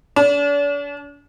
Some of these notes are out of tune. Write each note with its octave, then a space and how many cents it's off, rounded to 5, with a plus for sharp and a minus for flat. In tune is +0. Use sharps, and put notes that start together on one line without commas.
D4 -40